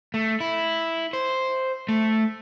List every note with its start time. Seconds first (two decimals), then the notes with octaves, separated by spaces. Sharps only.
0.14 A3
0.40 E4
1.13 C5
1.89 A3